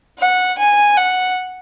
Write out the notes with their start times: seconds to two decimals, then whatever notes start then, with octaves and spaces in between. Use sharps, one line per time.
0.19 F#5
0.58 G#5
0.97 F#5